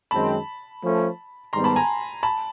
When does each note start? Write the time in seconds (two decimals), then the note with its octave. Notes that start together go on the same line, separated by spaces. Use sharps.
0.11 F#2 D#3 G#3 C4 D#4 A5 B5
0.82 F3 A3 C#4
1.52 G#2 D#3 G3 B3 A#5 C6
1.64 A5 B5
1.76 G#5 A#5
2.23 A5 B5